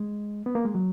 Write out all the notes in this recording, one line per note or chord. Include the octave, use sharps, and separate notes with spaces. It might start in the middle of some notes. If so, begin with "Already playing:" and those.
Already playing: G#3
B3
A#3
G#3
F#3